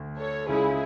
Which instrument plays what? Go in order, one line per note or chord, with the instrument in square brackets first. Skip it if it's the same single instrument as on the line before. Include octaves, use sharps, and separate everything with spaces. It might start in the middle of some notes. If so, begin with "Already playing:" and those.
Already playing: [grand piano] D2
[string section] A4 C#5
[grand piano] C#2 C#3 G#3 C#4 [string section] E4 G#4